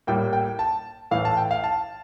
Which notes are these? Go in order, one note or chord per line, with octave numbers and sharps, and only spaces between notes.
A2 G3 A#3 G5
G5
A5
A2 E3 A3 F5
A5
G5
F5
A5